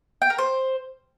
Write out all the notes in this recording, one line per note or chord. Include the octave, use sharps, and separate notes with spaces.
G5
A#4
C5